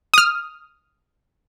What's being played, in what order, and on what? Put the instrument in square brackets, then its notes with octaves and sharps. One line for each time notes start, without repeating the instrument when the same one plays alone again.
[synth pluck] D#6 F6